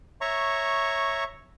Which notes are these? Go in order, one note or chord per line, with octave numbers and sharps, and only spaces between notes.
C#5 E5 A#5 C#6